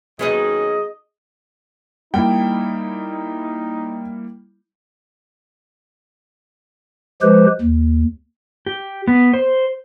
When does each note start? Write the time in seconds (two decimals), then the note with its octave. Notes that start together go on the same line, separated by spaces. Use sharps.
0.19 D#2 F#3 B3 C#4 D#4 G#4 D#5
2.14 G3 A#3 D#4 E4 G5
7.22 F3 G#3 G4 B4 C5
7.61 D#2
8.66 G4
9.07 B3
9.34 C5